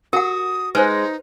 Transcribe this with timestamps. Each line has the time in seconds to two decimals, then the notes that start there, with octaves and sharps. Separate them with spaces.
0.13 F#4 A#4 F#5 D#6
0.75 G#3 D#4 B4 C5